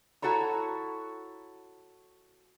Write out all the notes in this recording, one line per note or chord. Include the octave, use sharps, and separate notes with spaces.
E4 F#4 A4 C#5 A#5